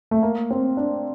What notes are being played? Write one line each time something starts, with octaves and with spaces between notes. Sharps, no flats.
A3
A#3
C4
D4